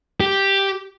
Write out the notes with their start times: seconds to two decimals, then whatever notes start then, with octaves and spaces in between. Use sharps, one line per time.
0.20 G4